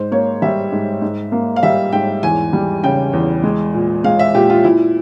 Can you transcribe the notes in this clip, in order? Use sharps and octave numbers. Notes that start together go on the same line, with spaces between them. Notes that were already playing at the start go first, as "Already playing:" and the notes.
Already playing: G#2 C5
A#3 C#5
G3 E5
G#2
G#2
A#3
F5
G3 E5
G#2 G5
E2 G#5
G3
C#3 G5
E2
G#3
A#2
G#3 F5
E5
A#2 G4
F4
A#2 E4